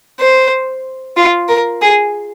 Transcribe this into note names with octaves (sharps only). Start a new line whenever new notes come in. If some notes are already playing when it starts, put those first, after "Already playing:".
C5
F4
A#4
G#4